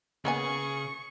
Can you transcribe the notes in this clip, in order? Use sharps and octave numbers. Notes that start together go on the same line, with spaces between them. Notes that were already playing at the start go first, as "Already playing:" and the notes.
C#3 A#3 B3 G#4 G#5 C#6